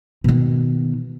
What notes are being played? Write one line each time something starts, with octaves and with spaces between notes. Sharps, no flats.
B2 D#3